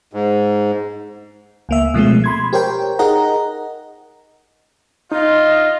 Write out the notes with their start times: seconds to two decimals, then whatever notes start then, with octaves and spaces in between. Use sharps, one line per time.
0.13 G#2
1.69 C#2 A#3 E5
1.94 B2 F3 G#3 A3 C4
2.24 B5 C6 G#6
2.53 G4 A#4 C5 C#5 G5
2.99 D#4 G#4 A#4 D#5 F#5 A#5
5.12 D#4 F4 D#5